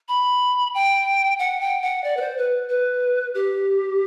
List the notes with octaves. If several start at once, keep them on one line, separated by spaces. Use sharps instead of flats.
B5
G5
F#5
G5
F#5
D5
B4
C5
B4
B4
G4